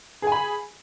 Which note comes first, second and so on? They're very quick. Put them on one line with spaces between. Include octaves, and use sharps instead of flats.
G#4 G#5 B5